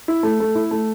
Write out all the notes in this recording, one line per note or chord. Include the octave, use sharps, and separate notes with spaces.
E4
A3
A3
E4
A3